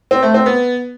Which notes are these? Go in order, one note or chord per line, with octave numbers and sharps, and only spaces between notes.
C4
A3
C4
B3